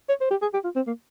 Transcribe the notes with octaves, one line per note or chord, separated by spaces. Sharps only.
C#5
C5
G4
G#4
G4
F4
C4
A#3